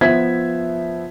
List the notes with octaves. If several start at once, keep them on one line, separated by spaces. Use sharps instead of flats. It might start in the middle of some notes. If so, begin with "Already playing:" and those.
F3 B3 C5 E5 G#6 B6